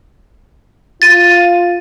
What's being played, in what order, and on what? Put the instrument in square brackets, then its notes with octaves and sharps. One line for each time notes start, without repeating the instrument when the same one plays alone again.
[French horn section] F4 [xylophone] A6 D#7